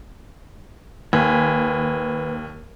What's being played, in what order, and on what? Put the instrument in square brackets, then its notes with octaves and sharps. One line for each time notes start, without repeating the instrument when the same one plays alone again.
[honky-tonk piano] D#2 [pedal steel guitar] B4 G#5